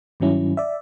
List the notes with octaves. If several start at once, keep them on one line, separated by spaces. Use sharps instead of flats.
G2 D#3 F#3 C#4 E4
D5 E5